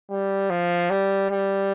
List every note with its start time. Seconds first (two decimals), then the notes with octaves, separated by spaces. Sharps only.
0.11 G3
0.50 F3
0.90 G3
1.30 G3